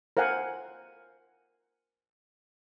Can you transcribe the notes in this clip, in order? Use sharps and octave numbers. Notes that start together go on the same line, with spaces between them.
A#4 C5 F5 F#5 G#5